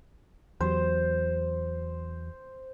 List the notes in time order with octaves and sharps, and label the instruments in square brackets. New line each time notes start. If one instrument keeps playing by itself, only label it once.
[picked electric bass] E2 F#3 [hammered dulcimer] C5